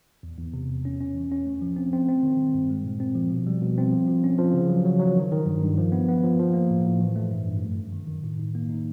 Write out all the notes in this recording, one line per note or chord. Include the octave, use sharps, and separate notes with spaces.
E2
E2
C3
E2
C#4
C#4
E3
C#4
A3
F3
C4
C4
C4
D#3
G3
G2
G#3
A#2
C4
F3
B2
G3
B2
C4
F3
F3
C#4
F3
C#3
F#3
F#3
F#3
D#3
D#3
G2
G2
F3
B3
B3
F3
F3
A#3
A2
A2
E3
A3
G2
G2
F#2
F#2
D#3
D#3
A2
D#4
A#3
D#4